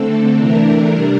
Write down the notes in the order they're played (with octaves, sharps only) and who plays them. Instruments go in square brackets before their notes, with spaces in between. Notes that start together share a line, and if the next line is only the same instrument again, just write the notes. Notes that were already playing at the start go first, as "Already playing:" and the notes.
Already playing: [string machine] D3 A3 C4 A4
C3 E3 A3 D4 A#4
C3 G3 D4